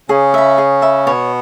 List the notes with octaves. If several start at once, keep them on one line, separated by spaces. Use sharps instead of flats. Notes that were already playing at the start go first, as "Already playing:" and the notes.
C#3 C#4 G#4
E5 B5
G#4
E5 B5
B2 B3 C#5